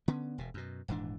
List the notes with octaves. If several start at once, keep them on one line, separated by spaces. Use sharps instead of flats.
D3 B3 C#4
E1 B2
F#2 B2
D#1 G#2 E3 D4